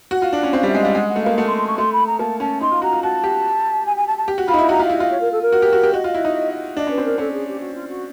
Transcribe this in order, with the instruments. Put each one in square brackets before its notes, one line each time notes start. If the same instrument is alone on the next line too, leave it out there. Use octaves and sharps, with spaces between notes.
[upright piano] F#4 [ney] F#5
[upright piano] F4
D4
C#4
[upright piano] C4 [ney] F5
[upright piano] G3 [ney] E5
[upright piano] G#3
[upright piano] G3 [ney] F5
[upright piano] G#3 [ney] F#5
[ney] F#5
[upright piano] A3
[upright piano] A#3 [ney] F5
[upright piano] A3 [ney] F#5
[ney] C6
C6
C#6
[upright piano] A3 [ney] C6
[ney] B5
A#5
[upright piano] A#3 [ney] A5
[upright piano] C#4 [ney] A5
[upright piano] D#4 [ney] C6
[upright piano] F4
[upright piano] F#4 [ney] A#5
[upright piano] F4
[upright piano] F#4 [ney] A5
[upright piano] G4
[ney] G#5
G#5
A5
A5
[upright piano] G4
F#4
[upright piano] F4 [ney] B5
[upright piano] D#4
E4
[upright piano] F#4 [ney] A#5
[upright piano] F4 [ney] F5
[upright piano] E4
[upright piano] F4 [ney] D#5
[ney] C#5
A#4
A4
A#4
[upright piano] F#4
G4
F#4
G4
[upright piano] F#4 [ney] D#5
[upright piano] F4
E4
D#4
[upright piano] D4 [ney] D#5
[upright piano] C#4 [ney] B4
[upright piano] C4
[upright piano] D4 [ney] A#4
[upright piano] C#4 [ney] A4
[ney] G#4
G4
F#4
F4
F#4